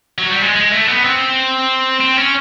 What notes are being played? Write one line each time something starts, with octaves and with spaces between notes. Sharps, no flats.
F#3
G3
G#3
G#3
A3
B3
C4
C4
C#4